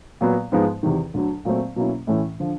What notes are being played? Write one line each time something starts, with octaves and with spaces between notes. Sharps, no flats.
A#2 F#3 B3
G#2 F3 G#3 B3 D#4
E2 C3 D#3
D2 D3 F#3
A#2 F#3 A3 C4
B2 F#3 A#3 C#4 E4
A2 E3 A3 C#4 E4
D3 F3